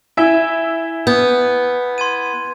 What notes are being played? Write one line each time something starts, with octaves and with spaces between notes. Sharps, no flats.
E4 E5 G#5 G#6 G7
B3 G6
C6 G#6 D#7